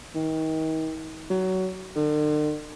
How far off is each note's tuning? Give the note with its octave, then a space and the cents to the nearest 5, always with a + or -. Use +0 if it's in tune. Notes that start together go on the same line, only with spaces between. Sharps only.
D#3 +35
F#3 +20
D3 +45